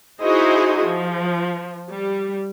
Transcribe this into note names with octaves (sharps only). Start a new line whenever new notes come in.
D#4 E4 F#4 G#4 C5 D#5
F3
G3